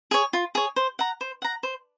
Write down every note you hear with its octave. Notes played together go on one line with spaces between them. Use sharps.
G#4 C#5
F4
G#4 C#5
C5
F#5 A#5
C5
F#5 A#5
C5